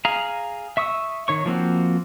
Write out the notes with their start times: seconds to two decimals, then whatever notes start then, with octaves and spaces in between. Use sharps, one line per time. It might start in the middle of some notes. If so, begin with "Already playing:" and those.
0.05 G#4 F5 A#5
0.77 E5 C#6 D#6 E6
1.28 D#3 C#5 C#6
1.46 F3 A#3 C4 F#4